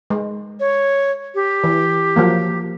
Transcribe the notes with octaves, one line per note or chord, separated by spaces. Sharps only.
G#3
C#5
G4
E3
F3 F#3 A#3